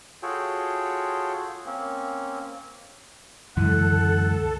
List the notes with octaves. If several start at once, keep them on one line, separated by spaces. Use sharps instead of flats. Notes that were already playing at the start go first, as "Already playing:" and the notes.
F4 F#4 G#4 A4 C#5 G5
A#3 C4 C#4
C#2 F#2 D3 E3 G#3 A4 F#5